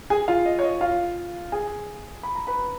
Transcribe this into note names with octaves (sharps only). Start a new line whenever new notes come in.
G#4 G#5
F4 F5
D#5
C#5
D#5
F4 F5
G#4 G#5
B5
A#5
B4 B5